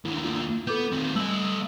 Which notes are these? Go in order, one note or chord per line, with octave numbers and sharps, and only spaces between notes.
D#2 D3 E4
A#3 F4
B3 A4 D6 G6
D#3 A3 C4
G3 A3 D#5 E6 F#7